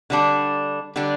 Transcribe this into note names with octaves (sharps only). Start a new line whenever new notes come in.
D3 G3 D4
D3 G3 D4